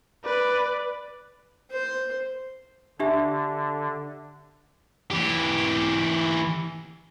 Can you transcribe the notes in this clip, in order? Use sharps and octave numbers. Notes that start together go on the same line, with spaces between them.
B4 D5
C5
D3 D4 G4 E5
E3 G4